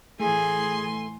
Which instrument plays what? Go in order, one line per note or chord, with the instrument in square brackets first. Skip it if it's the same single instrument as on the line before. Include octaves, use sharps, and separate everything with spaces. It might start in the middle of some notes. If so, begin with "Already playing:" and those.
[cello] A2 E3 [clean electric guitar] A3 [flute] G#4 [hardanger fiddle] G#5 C6